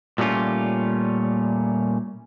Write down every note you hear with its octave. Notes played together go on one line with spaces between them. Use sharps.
A#2 G3 A3 C#4 F4